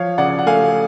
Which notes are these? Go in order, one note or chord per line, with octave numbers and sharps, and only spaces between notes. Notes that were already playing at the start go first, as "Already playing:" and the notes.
Already playing: F3 C#5 F5
C#3 D5 F#5
F#5
A3 F5 G#5